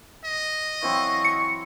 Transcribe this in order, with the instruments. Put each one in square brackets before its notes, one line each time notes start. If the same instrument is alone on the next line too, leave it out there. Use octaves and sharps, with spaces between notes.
[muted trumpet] D#5
[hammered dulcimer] E3 F#3 C4 [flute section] F5 G#5 C#6
[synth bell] C#7